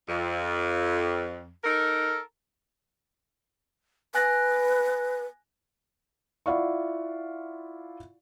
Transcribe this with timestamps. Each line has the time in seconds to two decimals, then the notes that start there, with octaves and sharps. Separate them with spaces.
0.08 F2
1.64 D#4 A4 A#4
4.15 B4 G#5 F#6 A#6
6.46 E4 F4 D5 F5 F#5 C#6